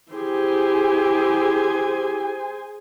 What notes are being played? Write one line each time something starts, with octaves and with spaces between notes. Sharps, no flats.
E4 G4 G#4 C5 G#5